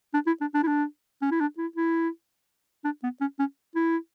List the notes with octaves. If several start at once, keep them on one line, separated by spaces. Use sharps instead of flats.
D4
E4
D4
D4
E4
D4
C#4
E4
D4
E4
E4
D4
B3
C#4
C#4
E4